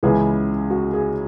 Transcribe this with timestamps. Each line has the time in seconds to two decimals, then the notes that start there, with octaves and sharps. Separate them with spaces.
0.03 C#2 C#3 E3 G#3 B3 G#4
0.70 F#4
0.93 G#4